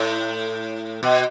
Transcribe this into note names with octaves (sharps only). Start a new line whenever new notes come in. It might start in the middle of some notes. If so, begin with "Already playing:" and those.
Already playing: A2
B2